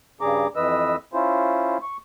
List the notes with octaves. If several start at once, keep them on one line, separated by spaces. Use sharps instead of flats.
G2 C#3 G3 G#4 A#5 D6
F2 E3 B4 D#5 E6
C#4 E4 F4 C5
C#6